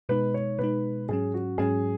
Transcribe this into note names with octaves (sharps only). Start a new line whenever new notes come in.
B2 G#3 D#4 B4
C#5
B2 G#3 D#4 B4
G#2 F#3 C#4 G#4
F#4
G#2 F#3 C#4 G#4